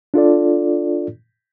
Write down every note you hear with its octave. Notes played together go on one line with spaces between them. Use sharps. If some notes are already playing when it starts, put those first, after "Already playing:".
D4 F4 A4 D5